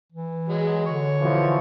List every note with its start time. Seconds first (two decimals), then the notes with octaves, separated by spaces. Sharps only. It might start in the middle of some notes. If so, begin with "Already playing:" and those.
0.12 E3
0.48 F#3 G#3
0.86 D3 C#5
1.21 B2 E3 F3